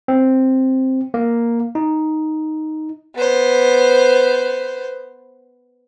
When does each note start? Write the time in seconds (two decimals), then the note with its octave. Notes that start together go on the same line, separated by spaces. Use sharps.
0.08 C4
1.14 A#3
1.75 D#4
3.15 B3 C5